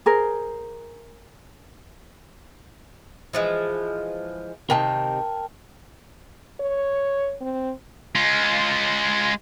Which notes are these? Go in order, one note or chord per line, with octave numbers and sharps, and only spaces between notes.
G#4 A#4 C5
E3 F3 G#3
C3 D#3 A#4 G5 A5
C#5
C4
G#3 F4